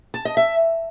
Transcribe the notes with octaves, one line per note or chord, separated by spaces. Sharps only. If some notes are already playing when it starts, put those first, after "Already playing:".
A5
D#5
E5